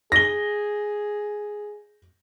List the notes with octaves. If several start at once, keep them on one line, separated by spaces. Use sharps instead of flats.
G#4 A#6 G7